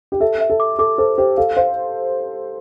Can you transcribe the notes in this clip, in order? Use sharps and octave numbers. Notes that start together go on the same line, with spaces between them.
G4
A4 E5
E5
A4
D6
A4 D6
A4 C5
G4 C5
A4 F5
C5 F5